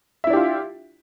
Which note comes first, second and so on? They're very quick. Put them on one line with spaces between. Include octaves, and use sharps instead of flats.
E5 E4 D4 G4 F4